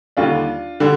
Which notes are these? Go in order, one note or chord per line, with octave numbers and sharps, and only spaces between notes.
D#2 D3 G3 D4 F4
D3 G3